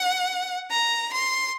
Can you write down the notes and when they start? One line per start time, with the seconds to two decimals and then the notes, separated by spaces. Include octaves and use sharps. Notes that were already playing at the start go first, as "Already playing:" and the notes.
Already playing: F#5
0.71 A#5
1.12 C6